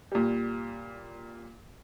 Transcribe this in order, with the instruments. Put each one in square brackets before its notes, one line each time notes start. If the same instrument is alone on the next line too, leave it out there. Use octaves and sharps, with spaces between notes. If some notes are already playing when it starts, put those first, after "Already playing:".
[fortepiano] A#2 G3